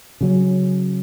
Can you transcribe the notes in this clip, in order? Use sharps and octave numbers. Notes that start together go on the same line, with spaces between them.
C#3 F#3 C#4